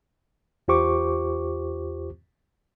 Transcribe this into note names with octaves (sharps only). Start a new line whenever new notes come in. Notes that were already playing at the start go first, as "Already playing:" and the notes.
E2 F4 G4 C5 C#6 D6